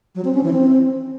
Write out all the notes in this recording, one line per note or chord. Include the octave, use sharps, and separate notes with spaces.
F#3
C4
C#4
E3
C4